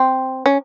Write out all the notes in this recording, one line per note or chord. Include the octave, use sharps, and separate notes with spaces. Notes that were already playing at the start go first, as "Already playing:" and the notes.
Already playing: C4
C#4